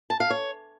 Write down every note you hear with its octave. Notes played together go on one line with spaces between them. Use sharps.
A5
F5
C#5